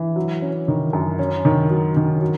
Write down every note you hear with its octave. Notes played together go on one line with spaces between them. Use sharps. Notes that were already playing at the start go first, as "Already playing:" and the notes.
Already playing: E3
F#3
C#4
D#3
F#2
C#4
D#3
F#3
D#3
F#3